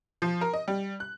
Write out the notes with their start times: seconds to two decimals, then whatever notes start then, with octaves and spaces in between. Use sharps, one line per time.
0.22 F3
0.41 A#4
0.53 D#5
0.68 G3
1.00 F#6